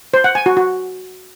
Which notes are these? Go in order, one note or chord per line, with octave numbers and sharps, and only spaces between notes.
C5
F#5
G#5
F#4
F#4